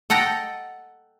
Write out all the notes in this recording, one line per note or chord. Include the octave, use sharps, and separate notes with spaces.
A4 D#5 F#5 G5 A#5